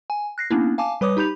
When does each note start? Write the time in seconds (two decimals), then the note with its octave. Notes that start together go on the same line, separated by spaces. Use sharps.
0.10 G#5
0.38 F#6 A#6 C7
0.51 A#3 B3 C#4 D4 E4
0.78 F5 G#5 A5 D6
1.01 G3 B4 C#5 D6 D#6
1.17 D#4 G4 B5 G6 F7